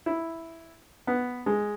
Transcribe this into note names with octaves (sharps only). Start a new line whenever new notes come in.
E4
B3
G#3